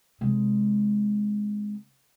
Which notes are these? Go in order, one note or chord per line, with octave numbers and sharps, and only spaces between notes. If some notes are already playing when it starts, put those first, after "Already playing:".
C3 G#3